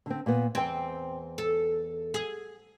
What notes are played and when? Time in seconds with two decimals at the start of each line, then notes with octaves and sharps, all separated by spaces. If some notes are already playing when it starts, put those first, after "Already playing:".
0.06 D3 C4
0.26 A#2 B3
0.55 E2 C4 G5
1.38 A4
2.14 G#4